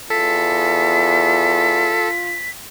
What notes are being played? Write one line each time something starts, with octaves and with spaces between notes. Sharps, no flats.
E2 F4 A4 B6